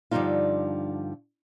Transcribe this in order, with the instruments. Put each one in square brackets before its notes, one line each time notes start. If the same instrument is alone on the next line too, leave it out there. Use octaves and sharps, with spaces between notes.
[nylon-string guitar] G2 D3 F3 G3 D#4 F4